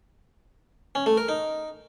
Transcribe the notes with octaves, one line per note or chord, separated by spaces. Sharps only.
C#4
A3
A#4
D#4